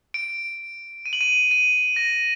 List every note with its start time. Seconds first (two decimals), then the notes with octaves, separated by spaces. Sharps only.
0.14 D7
1.06 D#7
1.13 F#7
1.21 D#7
1.51 D#7
1.96 A#6